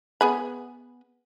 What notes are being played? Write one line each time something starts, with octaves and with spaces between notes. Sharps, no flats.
B3 G#4 B5